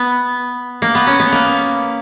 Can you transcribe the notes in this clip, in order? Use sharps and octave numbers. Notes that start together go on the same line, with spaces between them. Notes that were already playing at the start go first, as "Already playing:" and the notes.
Already playing: B3
A#3
B3
C#4
B3
A#3